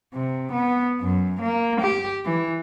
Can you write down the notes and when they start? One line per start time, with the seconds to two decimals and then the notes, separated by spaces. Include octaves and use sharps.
0.14 C3
0.52 B3
1.01 F#2
1.41 A#3
1.80 G4
2.25 E3